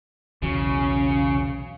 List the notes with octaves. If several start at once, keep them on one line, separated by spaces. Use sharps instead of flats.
B1 E2 C#3 F#3